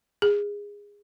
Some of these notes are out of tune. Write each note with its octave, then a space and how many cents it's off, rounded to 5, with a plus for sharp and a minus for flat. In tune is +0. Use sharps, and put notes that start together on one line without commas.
G#4 -20